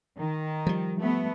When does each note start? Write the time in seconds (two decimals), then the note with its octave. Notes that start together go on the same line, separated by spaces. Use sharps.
0.19 D#3
0.66 F3 G3
1.00 A3 B3